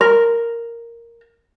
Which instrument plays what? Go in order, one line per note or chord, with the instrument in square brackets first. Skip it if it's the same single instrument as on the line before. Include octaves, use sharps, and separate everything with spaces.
[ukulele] A#4